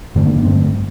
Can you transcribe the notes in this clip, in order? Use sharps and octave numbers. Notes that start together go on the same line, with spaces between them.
G2 D3 A3 C4
A#3 D4
A#3 D4
G2 D3 A3 C4